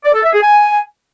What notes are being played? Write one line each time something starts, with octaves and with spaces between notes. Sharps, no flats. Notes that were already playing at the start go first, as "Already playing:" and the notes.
D5
A4
E5
G#4
G#5